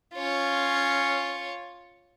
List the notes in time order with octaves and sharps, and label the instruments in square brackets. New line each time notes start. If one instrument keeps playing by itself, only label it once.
[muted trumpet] C#4 [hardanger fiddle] F4 C#5